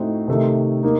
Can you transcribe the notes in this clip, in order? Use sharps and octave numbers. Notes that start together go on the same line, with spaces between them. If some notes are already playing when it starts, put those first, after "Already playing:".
Already playing: A2 A3 C4 D#4 F#4
C3 D#3 A3 D#4
A#3 D#4